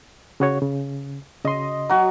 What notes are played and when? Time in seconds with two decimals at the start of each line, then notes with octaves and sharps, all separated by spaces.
0.40 C#3 F#4 C#5
0.62 C#3
1.45 C#3 D#5 C6
1.89 F#3 F#4